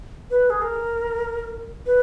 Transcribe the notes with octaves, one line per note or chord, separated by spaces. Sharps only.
B4
G#4
A#4
B4